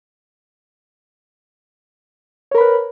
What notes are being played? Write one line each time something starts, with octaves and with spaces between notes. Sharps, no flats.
A#4 B4 C#5 B5